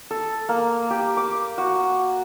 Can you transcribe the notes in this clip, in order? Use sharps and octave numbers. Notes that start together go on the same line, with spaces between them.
A4
A#3
G4
D6
F#4